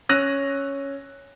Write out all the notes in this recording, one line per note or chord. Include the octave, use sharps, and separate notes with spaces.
C#4 E6 F#6 A#6 D#7 F7